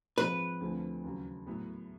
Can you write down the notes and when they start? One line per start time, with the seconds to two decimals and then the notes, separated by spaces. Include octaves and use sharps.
0.18 G#2 F3 G#3 C4 B4
0.60 D2 D3 F3 A3 C4
1.04 D#2 C#3 F#3
1.47 A2 F#3 B3 E4